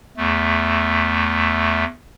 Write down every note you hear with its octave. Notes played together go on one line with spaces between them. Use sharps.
E2 A3